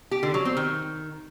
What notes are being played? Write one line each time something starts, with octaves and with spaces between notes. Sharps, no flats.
G4
D3
F#3
C4
D#3